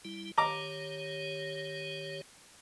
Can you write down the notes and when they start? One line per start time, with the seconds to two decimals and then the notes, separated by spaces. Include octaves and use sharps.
0.05 G3 E4
0.38 D#3 G4 C#5 A#5 D6